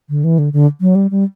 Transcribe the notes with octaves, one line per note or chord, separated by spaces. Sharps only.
D3
E3
D3
D3
F#3
G3
G3